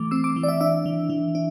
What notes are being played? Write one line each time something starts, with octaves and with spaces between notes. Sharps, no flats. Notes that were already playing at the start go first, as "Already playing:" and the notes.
Already playing: E3 A3 D6
C4 E6
D6
E3
D5
E5
D4 E5
E3
E3
D4